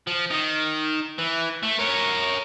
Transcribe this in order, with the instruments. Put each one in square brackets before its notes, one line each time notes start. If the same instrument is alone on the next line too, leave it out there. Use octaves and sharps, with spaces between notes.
[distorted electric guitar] F3
D#3
E3
A3
A#4 C#5